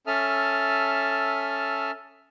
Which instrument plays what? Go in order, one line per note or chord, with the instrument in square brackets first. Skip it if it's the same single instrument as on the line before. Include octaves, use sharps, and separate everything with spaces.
[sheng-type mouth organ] C#4 A4 E5 A5 D#6 F6